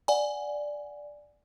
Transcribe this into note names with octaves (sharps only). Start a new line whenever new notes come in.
D5 F#5 G#5